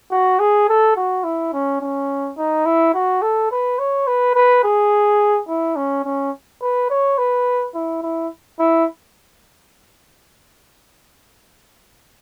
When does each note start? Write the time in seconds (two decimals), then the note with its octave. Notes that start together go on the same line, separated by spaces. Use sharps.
0.11 F#4
0.39 G#4
0.68 A4
0.96 F#4
1.24 E4
1.53 C#4
1.81 C#4
2.38 D#4
2.65 E4
2.94 F#4
3.22 A4
3.51 B4
3.79 C#5
4.07 B4
4.35 B4
4.64 G#4
5.48 E4
5.76 C#4
6.05 C#4
6.62 B4
6.90 C#5
7.18 B4
7.75 E4
8.02 E4
8.59 E4